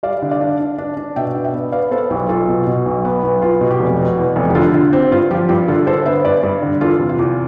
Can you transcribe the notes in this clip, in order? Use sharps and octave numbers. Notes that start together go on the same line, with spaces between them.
G3 D5 F5
D3
D5 F5
D4
D4
D4
D4
B2 E5 G5
D4
E5 G5
B3
B3 D5 F5
B3 A4 C5
B1 G4 B4
B1 F4 A4
B2
B2
B1
B3
B1
B3 F4
B2
G4
F1
B2
E2
F1
G4
D3 F4 A4
D3 F4
C4 G4
G2 F4
F3 G4
G2 G4
D3 F4 A4
D3 A4 C5
B3 C5 E5
G2 B4 D5
G2
D3
E2 F4 A4
C3
F4
E2